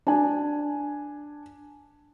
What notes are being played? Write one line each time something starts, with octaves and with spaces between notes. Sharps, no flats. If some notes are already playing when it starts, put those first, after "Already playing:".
D4 G#5